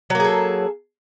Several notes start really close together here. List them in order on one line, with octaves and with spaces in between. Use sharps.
F#3 A#3 G#4 A4